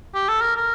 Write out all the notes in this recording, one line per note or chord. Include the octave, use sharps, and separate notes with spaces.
G4
A4
A#4
A#4